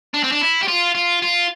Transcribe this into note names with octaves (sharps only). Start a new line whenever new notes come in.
D4
C4
D4
E4
G4
F4
F4
F4